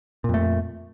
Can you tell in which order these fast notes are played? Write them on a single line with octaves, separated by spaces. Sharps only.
A#2 F2 A3